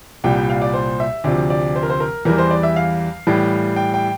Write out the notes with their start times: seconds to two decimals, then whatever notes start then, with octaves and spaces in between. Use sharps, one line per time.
0.24 C2 A#2 G3 G5
0.36 G5
0.50 F5
0.61 D5
0.74 C5
1.00 E5
1.24 D2 C3 F3 D5
1.50 D5
1.76 C5
1.83 A#4
1.90 C5
2.00 A#4
2.25 E2 E3 G3 A#4
2.38 C5
2.51 D5
2.63 E5
2.76 F5
3.27 A2 E3 G3
3.76 G5
3.94 G5